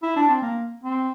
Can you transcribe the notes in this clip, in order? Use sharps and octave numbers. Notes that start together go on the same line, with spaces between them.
E4
D4
C4
A#3
C4